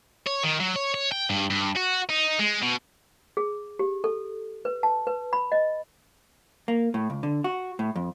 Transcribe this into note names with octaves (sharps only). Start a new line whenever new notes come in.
C#5
D#3
F#3
C#5
C#5
G5
G2
G2
F#4
D#4
G#3
B2
G#4
G4
A4
B4
A5
B4
B5
D#5
A#3
A2
C#2
D3
F#4
A2
F2